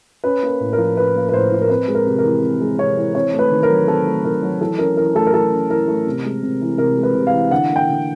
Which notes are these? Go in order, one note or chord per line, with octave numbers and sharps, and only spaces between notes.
C#4 B4
A#3
A2
A#4
F3
C#4 B4
A#3
B4
A2 C5
F3
A#4
C4 B4
G#3
A#4
C3
A#4
E3
C4
G#3
C3 C#5
E3
C4 C#5
A3
B4
D#3
A#4
F#3
C4 A4
A3
D#3 A#4
F#3
E3 A4
C#4 A#4
E3 A#4
A3 A4
A#4
E3 A4
C#4
E3 A#4
A3
C3
G#3
C3
E3
C3 A#4
G#3
B4
C3
F5
E3
D3 F#5
A#3
G5
D3